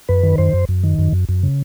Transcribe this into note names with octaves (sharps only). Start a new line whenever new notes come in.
F#2 B4
D#3
F#2 C5
F#2
F#2
D#3
F#2
F#2
F#2
C#3